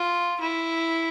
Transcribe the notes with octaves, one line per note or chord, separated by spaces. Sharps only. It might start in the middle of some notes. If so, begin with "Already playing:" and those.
Already playing: F4
E4